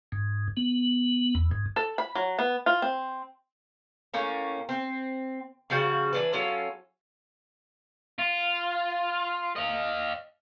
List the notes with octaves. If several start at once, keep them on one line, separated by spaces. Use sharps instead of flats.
G#2
B3
E2
G#2
A4
B5
F#3
B3
F4
C4
A2 A#3 C#4
C4
C#3 F3 G3 F#4
E3 D4 B4
F#3 C#4 F4 A4
F4
D#5 F5